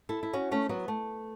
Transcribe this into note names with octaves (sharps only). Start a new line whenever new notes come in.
E4 A4
E4
C#4 F#4
A3 C#4
F#3 B3
A3